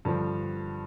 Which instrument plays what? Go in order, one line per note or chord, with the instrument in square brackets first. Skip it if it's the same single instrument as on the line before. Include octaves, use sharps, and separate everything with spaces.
[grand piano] G2 D3 F3